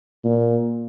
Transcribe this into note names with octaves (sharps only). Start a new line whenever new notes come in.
A#2